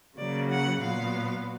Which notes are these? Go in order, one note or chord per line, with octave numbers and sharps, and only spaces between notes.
C#3 F#3 A#3 D5
F#5
A#2 F#3 B3 F5